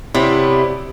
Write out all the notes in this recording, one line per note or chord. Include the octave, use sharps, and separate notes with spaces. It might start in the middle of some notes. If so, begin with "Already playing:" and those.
C3 B3 E4 C#5 D5